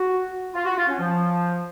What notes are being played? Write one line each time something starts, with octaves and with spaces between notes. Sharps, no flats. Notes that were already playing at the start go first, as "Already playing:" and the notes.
Already playing: F#4
F4
F#4
F4
C#4
F3